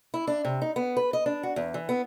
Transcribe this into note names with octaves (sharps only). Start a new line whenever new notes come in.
E4
D4
C3
D#4
B3
B4
D#5
D4
F#4
E2
E3
B3